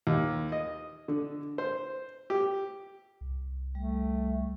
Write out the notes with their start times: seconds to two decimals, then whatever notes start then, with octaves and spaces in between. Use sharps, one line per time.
0.07 D#2
0.52 D#5
1.08 D3
1.58 C5
2.30 G4
3.21 C2
3.75 G3 A3